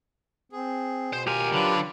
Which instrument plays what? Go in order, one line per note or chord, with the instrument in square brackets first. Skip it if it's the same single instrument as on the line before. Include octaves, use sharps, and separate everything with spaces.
[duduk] C4 [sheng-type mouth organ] G#4
[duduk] B2 [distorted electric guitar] C5
[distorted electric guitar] D#2 G#5 [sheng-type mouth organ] F4 [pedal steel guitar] G4 A#4
[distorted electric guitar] D3 [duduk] F#3 [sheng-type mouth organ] D4 F4 B4